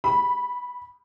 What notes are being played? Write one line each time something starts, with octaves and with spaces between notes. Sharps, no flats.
B5